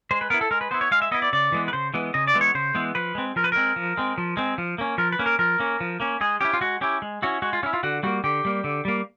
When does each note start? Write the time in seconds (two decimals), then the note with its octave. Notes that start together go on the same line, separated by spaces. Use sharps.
0.11 G#3 C5
0.21 B4
0.30 B3 E4 A#4
0.41 A4
0.51 G#3 A#4
0.61 B4
0.71 B3 E4 C5
0.81 C#5
0.91 G#3 F5
1.02 E5
1.11 B3 E4 D#5
1.22 D5
1.33 C#3 D5
1.52 E3 G#3 B3
1.68 B4
1.73 C#3 C5
1.94 E3 G#3 B3
2.14 C#3 D#5
2.27 D5
2.34 E3 G#3 B3
2.41 C#5
2.55 C#3 C5
2.75 E3 G#3 B3
2.95 F3 B4
3.15 G#3 C4
3.36 F3 A#4
3.44 B4
3.52 G#3 C4 A#4
3.76 F3
3.97 G#3 C4
4.18 F3
4.37 G#3 C4
4.58 F3
4.78 A#3 C#4
4.98 F3 A#4
5.12 B4
5.19 A#3 C#4
5.26 A#4
5.39 F3 A#4
5.59 A#3 C#4
5.81 F3
6.00 A#3 C#4
6.21 G#3 G#4
6.41 C#4 E4 G4
6.53 F4
6.61 G#3 F#4
6.81 C#4 E4 G4
7.02 G#3
7.22 C#4 E4 F#4
7.42 G#3 F#4
7.53 F4
7.63 C#4 E4 F#4
7.74 F4
7.83 D3 F#4
8.03 G3 A#3 F#4
8.24 D3 G4
8.45 G3 A#3
8.64 D3
8.85 G3 A#3